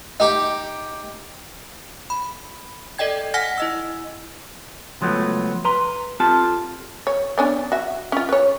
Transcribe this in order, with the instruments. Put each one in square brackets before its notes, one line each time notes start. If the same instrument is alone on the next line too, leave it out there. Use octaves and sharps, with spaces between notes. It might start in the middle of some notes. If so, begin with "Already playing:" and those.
[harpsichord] D#4 G4 D6
[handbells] B5
A4 D5 D#5 G5 G#6
F#5 G#5 F6 A#6 B6
E4 D#5 E6
[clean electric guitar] C#2 F3 F#3 A3 B3
B4 A#5 C6
C4 F4 G4 A4 A5
[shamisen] C#5
B3 C#4 D4
F#4 E5
C#4 F4
B4 C#5